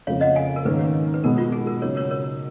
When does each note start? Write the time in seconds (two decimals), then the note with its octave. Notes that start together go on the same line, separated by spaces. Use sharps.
0.07 F2 C#3 F3 A#3 C#5 F5
0.21 D#5 F#5
0.36 F5 G#5
0.56 A#4
0.65 G#2 D#3 A#3 C#4 B4
1.14 B4
1.24 B2 G#3 B3 A#4
1.38 F4
1.52 G#4
1.67 A#4
1.82 C#3 F#3 A#3 D#4 A#4 C#5
1.97 A#4 C#5
2.11 A#4 C#5